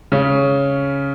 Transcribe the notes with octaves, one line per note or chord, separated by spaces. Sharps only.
C#3 C#4